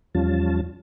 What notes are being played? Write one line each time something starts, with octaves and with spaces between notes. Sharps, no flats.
E2 F3 G3 C#4 F4 A5